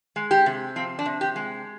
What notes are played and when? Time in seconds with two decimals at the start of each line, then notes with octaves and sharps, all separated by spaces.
0.16 G#3
0.31 G4
0.46 C3
0.76 F3 C4
0.99 D4
1.06 C3
1.21 G4
1.36 G#3